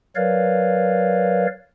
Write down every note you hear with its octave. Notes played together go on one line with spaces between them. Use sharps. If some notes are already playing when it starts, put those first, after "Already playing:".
F#3 A#4 B4 C#5 D5 F5